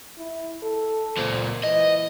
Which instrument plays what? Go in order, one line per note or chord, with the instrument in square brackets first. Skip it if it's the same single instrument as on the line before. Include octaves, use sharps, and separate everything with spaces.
[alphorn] E4
A4
[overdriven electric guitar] C#2 A#2 [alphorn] C5
[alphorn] E3 [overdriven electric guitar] D#5